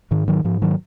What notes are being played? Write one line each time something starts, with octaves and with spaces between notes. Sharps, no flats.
G#2 D#3
D#3 F#3
G#2 F3
D#3 F#3